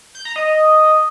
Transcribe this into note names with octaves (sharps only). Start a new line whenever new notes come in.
G6
A#5
D#5